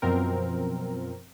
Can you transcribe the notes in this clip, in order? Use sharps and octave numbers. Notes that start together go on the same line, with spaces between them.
F#2 B2 F3 C4 A#4